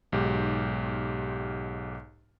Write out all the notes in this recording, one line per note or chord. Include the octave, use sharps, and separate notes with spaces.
B1 G#2 G4